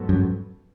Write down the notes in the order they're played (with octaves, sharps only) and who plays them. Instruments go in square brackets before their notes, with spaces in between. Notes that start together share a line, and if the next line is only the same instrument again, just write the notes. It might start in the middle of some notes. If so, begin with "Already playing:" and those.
Already playing: [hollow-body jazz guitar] G#2 F#3 B3 F#4 A4
[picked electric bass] F#2